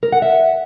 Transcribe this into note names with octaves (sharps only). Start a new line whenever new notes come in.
A#4
F#5
E5